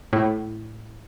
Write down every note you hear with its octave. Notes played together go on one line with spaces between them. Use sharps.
A2